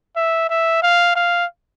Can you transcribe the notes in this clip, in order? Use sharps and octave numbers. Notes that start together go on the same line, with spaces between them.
E5
E5
F5
F5